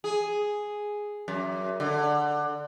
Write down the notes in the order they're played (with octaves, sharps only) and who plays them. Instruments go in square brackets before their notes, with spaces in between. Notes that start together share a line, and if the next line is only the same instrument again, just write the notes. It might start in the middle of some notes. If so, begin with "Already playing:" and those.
[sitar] G#4
F#2
D3